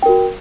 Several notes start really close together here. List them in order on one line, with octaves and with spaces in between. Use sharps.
G5 A#4 F#4